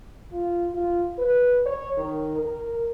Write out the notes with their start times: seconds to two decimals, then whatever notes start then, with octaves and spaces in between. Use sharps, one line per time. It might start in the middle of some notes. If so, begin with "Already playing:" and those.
0.32 F4
0.74 F4
1.18 B4
1.66 C#5
1.98 D#3
2.38 A#4